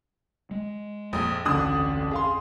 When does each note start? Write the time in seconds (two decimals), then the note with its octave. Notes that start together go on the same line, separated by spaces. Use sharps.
0.51 G#3
1.13 A#1 F2 D#6
1.45 A1 D2 D4 D#6
2.11 G#4 F5 C6